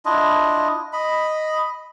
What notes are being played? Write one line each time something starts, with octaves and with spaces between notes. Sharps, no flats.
D4 E4 F4 D#5
D#5 B5